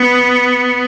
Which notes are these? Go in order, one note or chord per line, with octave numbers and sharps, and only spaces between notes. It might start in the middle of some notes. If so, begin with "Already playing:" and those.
Already playing: B3